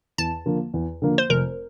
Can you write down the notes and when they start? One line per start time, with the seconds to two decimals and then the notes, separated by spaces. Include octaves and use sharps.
0.18 E2 A5
0.46 D3 F3 A#3
0.74 E2
1.02 D3 F3 A#3
1.18 C5
1.30 F1 A#4